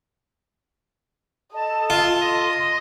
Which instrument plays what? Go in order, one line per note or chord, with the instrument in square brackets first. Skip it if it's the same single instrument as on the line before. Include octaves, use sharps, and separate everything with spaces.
[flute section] A4 A5 [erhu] D#5
[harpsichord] F4
[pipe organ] D#5 [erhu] C6